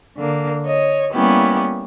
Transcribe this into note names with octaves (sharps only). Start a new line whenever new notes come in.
D3 A#3
C#5 D#5
G3 A#3 B3 C#4 E4 G4